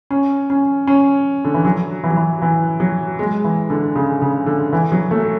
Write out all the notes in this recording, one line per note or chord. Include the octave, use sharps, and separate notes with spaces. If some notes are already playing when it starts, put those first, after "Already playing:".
C#4
C#4
C#4
D3
E3
F#3
E3
F#3
E3
E3
F#3
G#3
E3
D3
C#3
C#3
D3
E3
F#3
A3